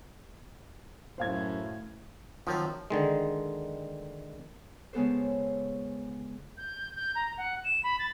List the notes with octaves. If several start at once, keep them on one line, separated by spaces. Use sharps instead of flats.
F#2 A2 C5 F5 G#6
D#3 F3 F#3 C4
D3 D#3 G#3
C#3 G#3 B3 A4 C5
G6
G6
A#5
F#5
E7
B5
A6